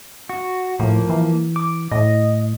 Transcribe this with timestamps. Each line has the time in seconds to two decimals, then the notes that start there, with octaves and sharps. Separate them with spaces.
0.29 F#4
0.79 A2 F3 A#3
1.10 E3
1.56 D6
1.92 A2 D#5